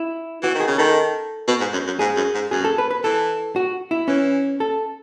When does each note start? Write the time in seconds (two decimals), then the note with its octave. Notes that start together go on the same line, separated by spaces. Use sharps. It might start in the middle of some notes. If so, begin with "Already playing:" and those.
Already playing: E4
0.43 E3 F#4
0.55 D#3
0.60 G#4
0.67 C#3
0.78 D#3 A4
1.48 B2
1.60 G#2
1.73 F#2
1.87 F#2
1.99 G#2 G#4
2.16 F#2
2.35 G#2
2.51 F#2 G#4
2.64 A4
2.78 B4
2.91 B4
3.03 E3 A4
3.56 F#4
3.91 E4
4.08 E3 C#4
4.60 A4